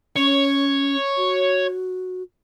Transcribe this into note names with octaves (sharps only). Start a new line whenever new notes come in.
C#4 C#5
F#4